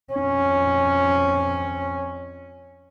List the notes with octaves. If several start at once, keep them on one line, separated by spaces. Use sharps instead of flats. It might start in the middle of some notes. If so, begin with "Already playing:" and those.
F2 C#4